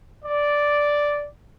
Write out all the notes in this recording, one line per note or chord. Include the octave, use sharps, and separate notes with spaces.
D5